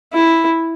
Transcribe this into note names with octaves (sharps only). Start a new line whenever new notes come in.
E4